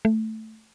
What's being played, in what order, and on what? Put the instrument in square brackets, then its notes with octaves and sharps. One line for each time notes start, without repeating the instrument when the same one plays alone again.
[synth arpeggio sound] A3